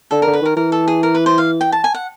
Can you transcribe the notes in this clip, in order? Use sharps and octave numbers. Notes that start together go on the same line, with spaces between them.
D3 A4
D3 A#4
B4
D#3 A#4
E3 A#4
A4
G#4
A#4
B4
C5
F5
G5
A5
G#5
F#5